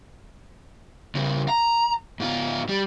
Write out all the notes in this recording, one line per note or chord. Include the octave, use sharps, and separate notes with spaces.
C#3 G3
A#5
G#2 F4
G3